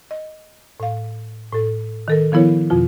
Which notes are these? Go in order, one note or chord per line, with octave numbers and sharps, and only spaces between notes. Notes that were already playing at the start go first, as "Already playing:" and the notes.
D#5
A2 F5
A2 A4
D#3 A4 A#4
D#3 F3 B3 E4 A#4 C#5
F2 B2 F3 F4